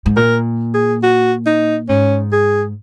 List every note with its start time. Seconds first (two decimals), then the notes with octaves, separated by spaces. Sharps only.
0.06 G#2
0.16 A#2 A#4
0.74 G#4
1.03 F#4
1.46 D#4
1.89 G#2 C#4
2.32 G#4